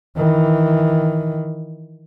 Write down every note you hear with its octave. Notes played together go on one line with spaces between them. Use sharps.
D#3 E3